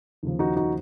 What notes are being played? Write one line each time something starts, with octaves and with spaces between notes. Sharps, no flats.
D#2 C#3 F3
D#4 F#4
D#4 F#4